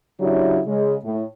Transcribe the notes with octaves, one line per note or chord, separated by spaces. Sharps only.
C#3 F#3 D4 E4 G4
C#3 G#3
A2